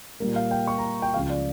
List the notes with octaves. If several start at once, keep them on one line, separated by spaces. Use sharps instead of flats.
A#2 G3 A#3
F5
G5
C#6
A#5
G5
C#2 C#3 F3 F5
D5